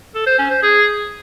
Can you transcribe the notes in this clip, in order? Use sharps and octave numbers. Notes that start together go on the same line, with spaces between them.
A4
C5
C#4
C5
G#4